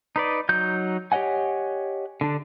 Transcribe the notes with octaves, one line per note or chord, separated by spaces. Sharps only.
D#4 B4 D5
F#3 D#4 G6
G4 C#5 D#5 F#5 G#5
D3 D4